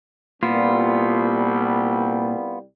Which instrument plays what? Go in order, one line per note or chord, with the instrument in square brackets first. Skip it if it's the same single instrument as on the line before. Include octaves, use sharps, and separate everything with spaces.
[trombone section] C2 G3 [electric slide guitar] A#2 [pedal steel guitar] B3 F4